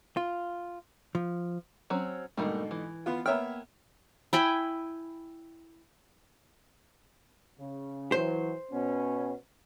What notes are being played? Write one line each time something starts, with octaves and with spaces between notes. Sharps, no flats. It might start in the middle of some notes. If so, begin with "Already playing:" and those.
F4
F3
F#3 C4 C#4
G#2 B2 D3 G3 A3 A#3
E3
B3 F4
A#3 B3 C#5 E5 G5 F6
E4 G5 G#5 B5
C#3
E3 F#3 C5
B2 B3 C#4